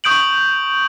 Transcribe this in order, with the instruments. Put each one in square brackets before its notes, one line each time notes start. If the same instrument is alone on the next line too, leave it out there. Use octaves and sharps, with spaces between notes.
[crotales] C#6 D#6 G6 D7 F#7